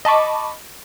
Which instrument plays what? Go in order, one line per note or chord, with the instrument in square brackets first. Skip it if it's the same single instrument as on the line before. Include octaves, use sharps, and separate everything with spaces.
[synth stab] D#5 A5 B5 C#6 D6